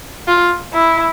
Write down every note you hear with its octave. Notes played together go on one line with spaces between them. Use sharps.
F4
E4